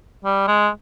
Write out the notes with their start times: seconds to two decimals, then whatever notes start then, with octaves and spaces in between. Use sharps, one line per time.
0.24 G3
0.48 G#3